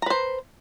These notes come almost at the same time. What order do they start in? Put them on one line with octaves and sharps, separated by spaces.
A#5 B4 C5